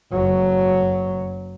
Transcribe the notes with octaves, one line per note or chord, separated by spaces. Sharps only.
F#1 F#3